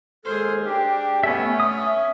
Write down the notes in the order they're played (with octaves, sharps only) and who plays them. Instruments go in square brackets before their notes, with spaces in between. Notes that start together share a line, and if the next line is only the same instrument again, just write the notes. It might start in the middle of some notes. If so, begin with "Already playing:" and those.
[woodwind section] D#2 G#3 F6 [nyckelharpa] G#4 C5 [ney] A4
[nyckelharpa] D4 [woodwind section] G4 [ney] G5
[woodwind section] A3 [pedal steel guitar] B3 E5 [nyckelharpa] C#4 [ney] G#5
[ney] E5 [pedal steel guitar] D#6